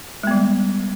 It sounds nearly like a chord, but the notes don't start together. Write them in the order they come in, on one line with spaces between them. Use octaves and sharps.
G#3 B3 G3